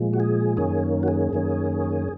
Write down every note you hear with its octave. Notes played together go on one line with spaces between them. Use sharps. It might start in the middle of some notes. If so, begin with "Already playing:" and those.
Already playing: A#2 F3 G#3
F#4
G#4
F#2 D#3 A#3 C#4 G#4
F#4
G#4
F#2 D#3 A#3 C#4